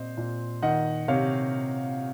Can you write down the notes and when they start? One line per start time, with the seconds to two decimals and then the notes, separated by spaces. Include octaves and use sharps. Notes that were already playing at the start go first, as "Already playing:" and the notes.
Already playing: A#2 C4 C5 D#5
0.17 A#2
0.62 D#3 D#5 F#5
1.08 C3 C#5 F5